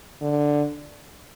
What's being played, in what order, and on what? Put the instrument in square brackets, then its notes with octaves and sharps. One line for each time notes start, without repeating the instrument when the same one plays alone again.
[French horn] D3